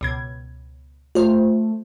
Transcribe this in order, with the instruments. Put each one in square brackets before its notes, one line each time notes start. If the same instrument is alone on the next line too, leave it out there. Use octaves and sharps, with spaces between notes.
[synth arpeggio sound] C#2 B2 G#6
[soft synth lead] A3 [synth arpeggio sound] F4 C5